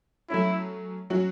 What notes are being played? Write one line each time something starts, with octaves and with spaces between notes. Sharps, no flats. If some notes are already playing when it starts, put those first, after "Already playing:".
F#3 A3 C#4 E4
F#3 C#4 F#4